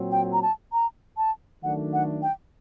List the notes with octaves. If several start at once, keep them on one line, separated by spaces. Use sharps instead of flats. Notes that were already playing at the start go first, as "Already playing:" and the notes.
Already playing: A#2 F#3 C4
G5
A#5
A5
A#5
A5
D#3 F#3 A3 D4 F#5
F#5
G5